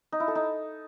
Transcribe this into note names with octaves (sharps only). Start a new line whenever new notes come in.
D#4
E4
A4
D#4